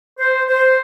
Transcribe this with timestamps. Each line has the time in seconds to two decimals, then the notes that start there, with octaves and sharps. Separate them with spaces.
0.19 C5
0.47 C5